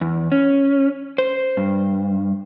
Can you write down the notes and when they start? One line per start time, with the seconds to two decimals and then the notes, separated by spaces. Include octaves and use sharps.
0.01 E2
0.32 C#4
1.18 C5
1.57 G2